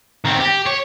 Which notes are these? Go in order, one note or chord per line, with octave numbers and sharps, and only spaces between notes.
D#3 C4
G4
C#5